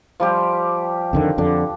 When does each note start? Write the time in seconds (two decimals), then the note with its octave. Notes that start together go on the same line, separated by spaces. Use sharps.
0.20 F3 G3 G4
1.13 F2 D3 D#3
1.38 F2 D3 D4